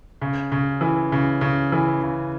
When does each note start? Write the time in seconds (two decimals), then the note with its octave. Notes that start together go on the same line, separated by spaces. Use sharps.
0.21 C#3
0.52 C#3
0.81 E3
1.12 C#3
1.41 C#3
1.72 E3
2.02 C#3